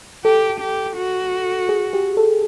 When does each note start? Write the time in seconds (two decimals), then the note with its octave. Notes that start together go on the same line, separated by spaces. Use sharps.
0.25 G4 A4
0.61 G4
0.97 F#4
1.69 G#4
1.93 G4
2.17 A4